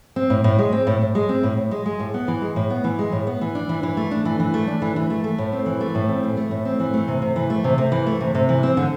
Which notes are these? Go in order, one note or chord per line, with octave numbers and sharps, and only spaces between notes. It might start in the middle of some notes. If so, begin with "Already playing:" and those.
C4
A2
A2
G#3
C4
A2
A2
G#3
C4
A2
A2
G#3
G#3
A2
B3
E3
G#3
A2
B3
E3
G#3
A2
B3
E3
D4
E3
E3
A3
D4
E3
E3
A3
D4
E3
E3
A3
A3
A2
C4
E3
A3
A2
C4
E3
A3
A2
C4
E3
A3
C3
C3
E3
A3
C3
C3
E3
A3
C3
C3
E3
C4
D3